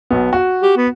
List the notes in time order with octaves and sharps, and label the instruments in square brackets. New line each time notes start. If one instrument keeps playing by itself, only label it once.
[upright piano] B1 B3
F#4
[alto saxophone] G4
B3